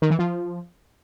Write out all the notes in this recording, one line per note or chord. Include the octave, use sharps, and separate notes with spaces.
D#3
E3
F3